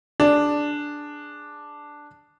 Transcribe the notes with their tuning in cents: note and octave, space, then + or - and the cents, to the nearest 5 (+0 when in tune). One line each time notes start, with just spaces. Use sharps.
D4 +0 G#4 +0